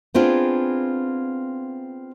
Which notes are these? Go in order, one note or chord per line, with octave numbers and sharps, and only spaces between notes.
B3 C4 D4 F4 G#4